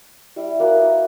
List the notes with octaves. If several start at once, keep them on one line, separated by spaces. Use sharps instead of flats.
G3 E4
A#3 F#4 B4
D#5